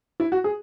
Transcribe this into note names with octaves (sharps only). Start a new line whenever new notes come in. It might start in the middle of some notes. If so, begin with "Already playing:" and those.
E4
F#4
G#4